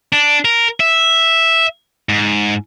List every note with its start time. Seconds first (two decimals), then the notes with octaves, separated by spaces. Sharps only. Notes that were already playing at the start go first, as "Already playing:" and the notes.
0.13 D4
0.45 A#4
0.80 E5
2.09 G#2